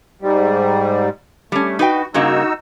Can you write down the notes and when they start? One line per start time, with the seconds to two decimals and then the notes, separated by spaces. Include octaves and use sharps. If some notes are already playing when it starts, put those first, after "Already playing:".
0.22 G#2 G3
1.52 G3 A3 C#4
1.79 D#4 F#4 B4 G5
2.14 G2 C#3 A#3 D#4 F#4 E6